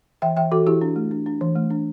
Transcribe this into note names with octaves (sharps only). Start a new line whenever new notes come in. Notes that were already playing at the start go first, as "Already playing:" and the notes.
E3 E5 G5
E3 E5 G5
E3 F#4 A4
E3 E4 G4
D4
A3
D4
D4
E3
A3
D4